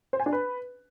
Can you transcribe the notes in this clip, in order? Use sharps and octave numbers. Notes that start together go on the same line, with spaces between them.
C5
G#5
D4
B4